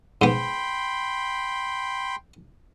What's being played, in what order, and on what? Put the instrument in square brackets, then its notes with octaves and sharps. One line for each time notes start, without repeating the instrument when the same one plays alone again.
[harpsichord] G#2 B3 [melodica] G5 B5 C6